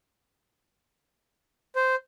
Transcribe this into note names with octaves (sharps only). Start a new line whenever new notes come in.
C5